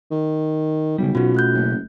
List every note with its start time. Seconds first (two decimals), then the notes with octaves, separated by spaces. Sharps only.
0.11 D#3
0.98 B1 C#3 G3
1.15 B2 C#4 F4 F#4
1.34 A3 F#6 G6
1.54 F#1